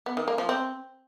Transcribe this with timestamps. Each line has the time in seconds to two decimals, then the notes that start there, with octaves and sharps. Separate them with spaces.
0.06 B3
0.17 D#3
0.28 A#3
0.38 F3
0.49 C4